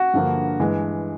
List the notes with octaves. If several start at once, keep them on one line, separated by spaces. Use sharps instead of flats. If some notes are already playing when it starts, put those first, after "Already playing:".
Already playing: F#4
G2 D3 F3 A#3
G2 E3 G#3